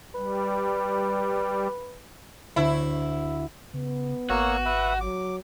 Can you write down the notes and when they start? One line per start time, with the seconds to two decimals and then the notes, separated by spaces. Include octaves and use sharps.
0.15 G3 B4
2.56 D2 E4 C#5 C#7
3.74 C#3 B3
4.30 G#1 A#3 F#4 C#5 E6
4.65 B4 E5
5.01 F#3 D6